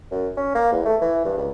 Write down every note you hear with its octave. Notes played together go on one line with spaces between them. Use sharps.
F#2
C#4
A#3
E2
A3
E3
G2
C#2